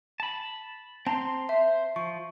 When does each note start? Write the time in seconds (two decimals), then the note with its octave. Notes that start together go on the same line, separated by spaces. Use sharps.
0.20 A5 B5
1.07 C4 A5 A#5 C6
1.49 C5 E5
1.96 F3 C#6